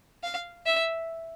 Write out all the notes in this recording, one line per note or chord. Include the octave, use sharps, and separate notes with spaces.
F5
E5